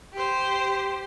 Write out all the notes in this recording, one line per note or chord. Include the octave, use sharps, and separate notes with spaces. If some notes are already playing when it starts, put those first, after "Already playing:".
G4 C5